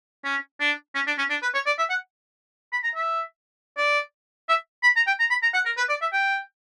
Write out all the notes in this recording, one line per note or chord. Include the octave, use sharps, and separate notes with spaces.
C#4
D4
C#4
D4
C#4
D4
B4
C#5
D5
E5
F#5
B5
A#5
E5
D5
E5
B5
A#5
G5
A#5
B5
A#5
F#5
A#4
B4
D5
E5
G5